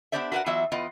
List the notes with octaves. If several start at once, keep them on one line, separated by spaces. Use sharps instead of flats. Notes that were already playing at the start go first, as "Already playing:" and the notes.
B3 D4 G4 C5 D5 E5
F#4 A#4 B4 D5 F#5
E3 F#3 B3 F4 D#5 E5
E2 B3 F4 B4 D#5